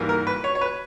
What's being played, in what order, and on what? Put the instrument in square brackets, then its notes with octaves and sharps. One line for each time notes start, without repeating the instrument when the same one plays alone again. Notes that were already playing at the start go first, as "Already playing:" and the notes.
Already playing: [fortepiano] G#2 E3 G3 A#3
A#4
B4
C#5
C#5
B4